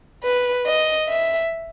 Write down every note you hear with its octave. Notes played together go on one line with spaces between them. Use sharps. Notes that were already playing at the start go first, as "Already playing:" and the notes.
B4
D#5
E5